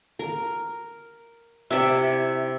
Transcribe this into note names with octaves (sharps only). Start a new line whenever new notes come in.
A#4
C3 E4 D5 E5